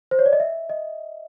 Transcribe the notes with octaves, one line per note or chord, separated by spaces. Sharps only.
C5
C#5
D5
D#5
E5
D#5